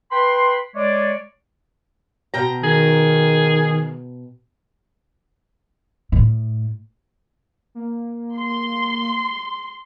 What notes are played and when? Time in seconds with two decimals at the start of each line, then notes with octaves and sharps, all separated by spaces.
0.11 B4 G5 B5 C6
0.75 G#3 C#5 D5
2.34 B2 G5 A#5
2.63 D#3 G#4
6.12 A2
7.75 A#3
8.37 C6